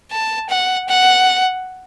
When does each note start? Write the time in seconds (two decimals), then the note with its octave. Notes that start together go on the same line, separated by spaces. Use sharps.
0.12 A5
0.50 F#5
0.89 F#5